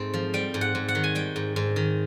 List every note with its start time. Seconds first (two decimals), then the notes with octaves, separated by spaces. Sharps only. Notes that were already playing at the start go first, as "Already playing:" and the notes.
Already playing: G#2 A3 C4
0.14 F3
0.34 G3 G5
0.54 G#2
0.61 F#5
0.75 G#2
0.88 F#5
0.95 D#3
1.04 G#5
1.15 G3 G5
1.36 G#2
1.56 G#2
1.76 D#3